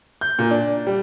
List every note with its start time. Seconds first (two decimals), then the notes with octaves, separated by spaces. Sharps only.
0.21 G6
0.39 A#2
0.51 D4
0.87 G3